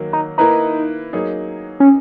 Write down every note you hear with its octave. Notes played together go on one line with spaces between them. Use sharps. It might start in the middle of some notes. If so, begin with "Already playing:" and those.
Already playing: D#3 F#3 A#3
D#4
A#3 D#4 E4 B4
F#3 A#3 D#4 G#4
C#4